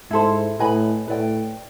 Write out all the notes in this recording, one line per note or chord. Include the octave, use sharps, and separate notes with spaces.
G#2 E4 A4 C5
A2 B4 D#5 G#5 B5
A2 B4 D5 G5